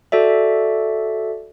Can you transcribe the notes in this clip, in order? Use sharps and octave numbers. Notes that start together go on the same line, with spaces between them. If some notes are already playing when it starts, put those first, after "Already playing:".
F#4 A4 D5 E5